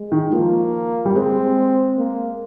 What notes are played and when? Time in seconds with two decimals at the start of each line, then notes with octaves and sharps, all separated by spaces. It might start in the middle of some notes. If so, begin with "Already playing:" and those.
Already playing: G#3
0.12 D#3
0.32 F3 A#3
1.05 G3
1.15 G#3 C4
1.98 A#3